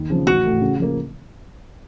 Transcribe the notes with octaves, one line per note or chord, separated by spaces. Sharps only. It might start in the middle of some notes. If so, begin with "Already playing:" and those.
Already playing: D#2
C#3 F3 C4
A1 F#4
A2 A3
C#3
F3 A#3